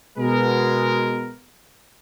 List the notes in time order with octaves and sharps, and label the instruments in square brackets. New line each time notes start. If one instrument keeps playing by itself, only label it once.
[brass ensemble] B2 G#3 B3 A#4